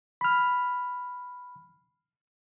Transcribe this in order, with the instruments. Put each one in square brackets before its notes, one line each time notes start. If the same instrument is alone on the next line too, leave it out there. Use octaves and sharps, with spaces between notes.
[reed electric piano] B5 F6